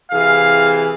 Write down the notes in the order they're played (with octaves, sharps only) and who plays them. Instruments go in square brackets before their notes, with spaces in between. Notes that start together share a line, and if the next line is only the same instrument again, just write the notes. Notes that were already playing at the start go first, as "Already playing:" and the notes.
[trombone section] C3 E3 G#4 [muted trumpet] F5